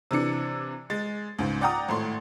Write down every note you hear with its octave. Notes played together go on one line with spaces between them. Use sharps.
C3 E3 D4 C#7
G#3 A6
C#2 G#2
D5 F#5 G5 A#5 D#6
G#1 A2 C6